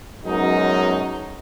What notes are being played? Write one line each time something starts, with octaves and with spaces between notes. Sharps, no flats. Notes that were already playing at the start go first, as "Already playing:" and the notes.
F#2 B2 F#3 G#3 D#4